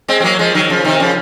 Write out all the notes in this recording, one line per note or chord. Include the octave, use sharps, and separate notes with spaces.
G#3 C4
C4
F#3 A#3
F3 G#3
D#3 F#3
F#3
C#3 F3
C3 D#3
C#3 F3